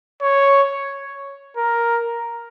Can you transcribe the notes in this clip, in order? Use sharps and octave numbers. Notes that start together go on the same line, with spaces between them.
C#5
A#4